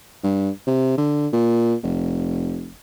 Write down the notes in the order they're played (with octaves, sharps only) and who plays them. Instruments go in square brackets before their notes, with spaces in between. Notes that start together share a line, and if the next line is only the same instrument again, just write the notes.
[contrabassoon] G2
C3
D3
A#2
F1